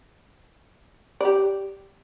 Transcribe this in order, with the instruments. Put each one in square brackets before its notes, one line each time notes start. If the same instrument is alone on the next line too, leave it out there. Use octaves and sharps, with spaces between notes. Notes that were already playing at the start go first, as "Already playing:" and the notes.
[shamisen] G4 D5